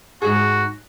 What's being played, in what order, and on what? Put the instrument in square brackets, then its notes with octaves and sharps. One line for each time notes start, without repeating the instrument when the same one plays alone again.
[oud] G#2 G#4 [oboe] F#4